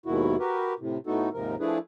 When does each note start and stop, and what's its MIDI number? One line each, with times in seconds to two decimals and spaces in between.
0.06 0.36 39
0.06 0.36 44
0.06 0.36 47
0.06 0.36 51
0.06 0.36 64
0.06 0.36 66
0.40 0.74 66
0.40 0.74 67
0.40 0.74 70
0.40 0.74 71
0.80 0.98 45
0.80 0.98 48
1.07 1.29 45
1.07 1.29 57
1.07 1.29 59
1.07 1.29 63
1.07 1.29 66
1.07 1.29 69
1.34 1.56 39
1.34 1.56 44
1.34 1.56 48
1.34 1.56 53
1.34 1.56 70
1.60 1.78 53
1.60 1.78 57
1.60 1.78 62
1.60 1.78 64
1.60 1.78 68
1.60 1.78 71